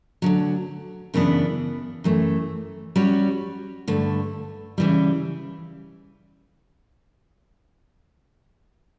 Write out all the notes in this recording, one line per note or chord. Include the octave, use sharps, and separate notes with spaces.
D2 D3 F#3
F#2 C#3 E3 B3 D4
F#2 E3 A3
G3 C#4 F#4 C#5
G2 D3 A3
C#3 E3 G3